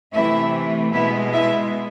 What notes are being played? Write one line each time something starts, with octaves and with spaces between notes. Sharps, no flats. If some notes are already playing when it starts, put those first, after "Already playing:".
C3 E3 A3 E4 E5
B2 G#3 B3 E4 E5
E4 E5